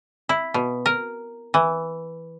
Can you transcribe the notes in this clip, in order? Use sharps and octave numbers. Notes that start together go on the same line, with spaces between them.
E4
B2
A#4
E3